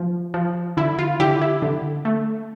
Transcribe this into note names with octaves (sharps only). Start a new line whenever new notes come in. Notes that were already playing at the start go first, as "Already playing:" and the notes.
Already playing: F3
F3
D3 E4
F4
D3 E4 G4
E4
D3
A3